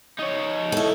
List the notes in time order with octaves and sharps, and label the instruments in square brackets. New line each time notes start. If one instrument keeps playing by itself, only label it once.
[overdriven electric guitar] D#4 C#5
[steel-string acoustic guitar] E4 A4